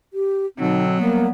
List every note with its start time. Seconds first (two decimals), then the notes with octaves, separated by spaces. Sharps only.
0.13 G4
0.58 B2 D3 F#3 C4 D#4
0.99 G3 A#3 B3